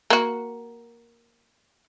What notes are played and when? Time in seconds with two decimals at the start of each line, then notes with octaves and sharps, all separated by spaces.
0.10 A#3 F#4